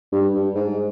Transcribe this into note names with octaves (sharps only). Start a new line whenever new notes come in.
G2
G2
G#2